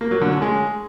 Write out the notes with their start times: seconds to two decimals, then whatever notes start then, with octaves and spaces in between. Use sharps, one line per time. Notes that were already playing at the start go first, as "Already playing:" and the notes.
0.01 A#3
0.11 F#3
0.21 D3
0.32 C#4
0.42 G#3